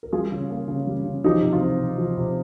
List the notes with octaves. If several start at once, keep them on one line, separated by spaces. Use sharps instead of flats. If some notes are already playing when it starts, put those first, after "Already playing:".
A#4
G3 F4 G#4
C#3
A#3
C#3
G3
C#3
F3 D#4 G4
C3
F4
C4
C3
F3
C3